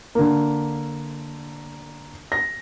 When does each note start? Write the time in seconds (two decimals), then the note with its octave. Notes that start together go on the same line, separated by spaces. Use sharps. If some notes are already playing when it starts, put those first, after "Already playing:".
0.15 D3 A#3
2.32 A#6